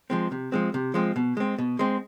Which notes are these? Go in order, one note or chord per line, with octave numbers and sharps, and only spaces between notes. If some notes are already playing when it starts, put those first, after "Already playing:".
F3 G#3 C4
C3
F3 G#3 C4
C3
F3 G#3 C4
B2
G#3 C4
B2
G#3 C4